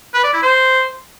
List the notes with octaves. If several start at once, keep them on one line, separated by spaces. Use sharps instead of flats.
B4
D5
E4
C5